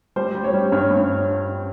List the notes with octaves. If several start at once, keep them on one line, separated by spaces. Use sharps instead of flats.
G3 C5
G3
C#5
G3
G2 C#5
G2